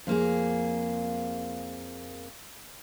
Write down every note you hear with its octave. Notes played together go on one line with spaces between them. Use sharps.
F2 A#3 G#4